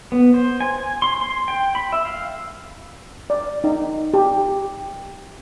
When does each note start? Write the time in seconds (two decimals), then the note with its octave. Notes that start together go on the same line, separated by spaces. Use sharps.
0.12 B3
0.34 C5
0.61 G#5
0.78 G#5
1.02 C6
1.21 C6
1.48 G5
1.75 B5
1.92 E5
2.05 F5
3.30 D5
3.64 D#4
4.14 G4